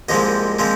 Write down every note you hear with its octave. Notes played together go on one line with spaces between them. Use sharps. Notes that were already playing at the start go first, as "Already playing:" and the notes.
C2 A#2 F3 G#3 C4 D#5
A#2 F3 G#3 C4